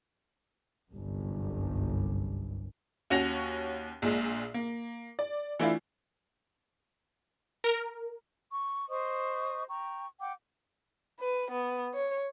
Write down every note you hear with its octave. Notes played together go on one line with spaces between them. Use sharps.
G1 C2 F#2
D#2 C#4 F#4 A#6 F7
A#1 A#2 G#3
A#3
D5
E3 A3 D4 E4 F4
A#4
C#6
C5 D#5 C#6 D#6
G5 A#5 C#6
F#5 G5 D6
B4
B3
C#5